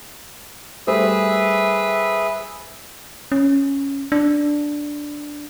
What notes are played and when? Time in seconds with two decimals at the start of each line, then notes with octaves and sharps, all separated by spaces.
0.87 G3 A3 G#4 B4 C5 E5
3.32 C#4
4.12 D4